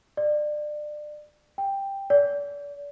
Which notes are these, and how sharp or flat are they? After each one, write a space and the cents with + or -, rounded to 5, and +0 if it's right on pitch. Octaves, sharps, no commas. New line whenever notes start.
D5 +25
G5 +5
D5 -35